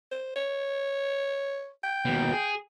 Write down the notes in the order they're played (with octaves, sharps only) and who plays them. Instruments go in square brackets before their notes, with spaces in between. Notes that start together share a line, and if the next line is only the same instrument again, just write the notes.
[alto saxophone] C5
C#5
G5
[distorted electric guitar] D#2 B2
G#4